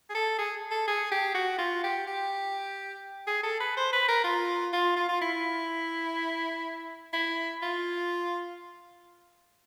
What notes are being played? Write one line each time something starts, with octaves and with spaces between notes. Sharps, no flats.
G#4
A4
G#4
A4
G#4
G4
F#4
F4
G4
G4
G#4
A4
B4
C5
B4
A#4
F4
F4
F4
F4
E4
E4
F4